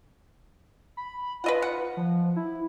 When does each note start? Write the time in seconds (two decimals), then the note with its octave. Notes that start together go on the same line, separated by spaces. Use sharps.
0.97 B5
1.44 F4 B4 D#5 F#5
1.62 F#5
1.97 F3
2.36 E4